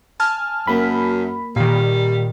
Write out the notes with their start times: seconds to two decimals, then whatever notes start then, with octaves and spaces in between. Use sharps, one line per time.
0.20 G#5 A5 F6
0.67 F#2 A#3 B5
1.56 A#2 D#3 G3